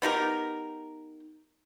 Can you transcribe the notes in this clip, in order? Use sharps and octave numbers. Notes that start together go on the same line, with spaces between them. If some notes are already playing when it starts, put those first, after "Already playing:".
B3 D#4 G4 A#4